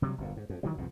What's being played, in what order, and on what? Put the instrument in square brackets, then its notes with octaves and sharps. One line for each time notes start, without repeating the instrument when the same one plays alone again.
[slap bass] C3 F#3 G3
G1 F2 A#2
G#2
F2
D#3 E3 F#3 G3
C2 F2 G#2 B2